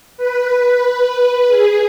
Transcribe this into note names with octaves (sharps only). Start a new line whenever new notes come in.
B4
G#4